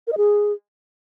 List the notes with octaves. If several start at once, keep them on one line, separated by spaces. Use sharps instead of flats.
A#4
D#5
G#4